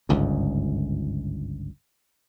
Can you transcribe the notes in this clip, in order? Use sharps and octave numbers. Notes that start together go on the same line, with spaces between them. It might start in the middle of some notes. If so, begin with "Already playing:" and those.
G1 C#2 G#2